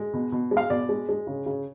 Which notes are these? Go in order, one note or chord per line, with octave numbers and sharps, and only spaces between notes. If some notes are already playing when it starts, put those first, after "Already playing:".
Already playing: G#3
B2
B2
G#3
F5
B2 D5
G#3
G#3
C#3
C#3